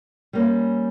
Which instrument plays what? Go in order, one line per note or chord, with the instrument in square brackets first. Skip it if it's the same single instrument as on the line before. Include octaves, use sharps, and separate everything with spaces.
[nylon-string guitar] G3 A#3 C#4